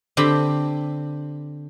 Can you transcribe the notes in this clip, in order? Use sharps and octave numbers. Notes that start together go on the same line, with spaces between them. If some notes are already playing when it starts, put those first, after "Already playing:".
D3 C4 G4 B5